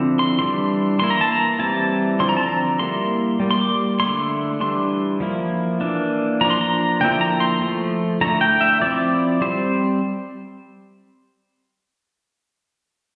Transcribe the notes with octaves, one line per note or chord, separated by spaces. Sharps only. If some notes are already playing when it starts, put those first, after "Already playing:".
Already playing: D3 F3 C4 E4
C6
E3 G3 D4 C6
E3 A#3 E4 C6
A#5
A5
A#5
E3 G3 C4 E4 A5
D3 F3 C4 C6
A#5
A5
A#5
G3 A#3 E4 C6
G3 A#3
C6
D6
D3 A3 E4 C6
E3 G3 D4 C6
F3 A#3 E4
E3 A#3 D4
F3 A#3 D4 A#5
C6
A#5
D3 F3 A#3 E4 G5
A#5
C6
F3 A3
D3 A3 E4 A#5
G5
E5
F3 C4 E4 D5
G3 C4 C5